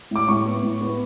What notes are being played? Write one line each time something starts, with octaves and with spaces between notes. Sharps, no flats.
A2 D6
A2 C#6
B3
A2
B3